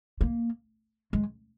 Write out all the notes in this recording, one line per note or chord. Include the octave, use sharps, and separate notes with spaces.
A#3
G#3